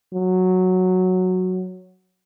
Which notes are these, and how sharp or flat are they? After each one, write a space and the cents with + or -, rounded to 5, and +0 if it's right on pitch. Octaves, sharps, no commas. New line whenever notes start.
F#3 -5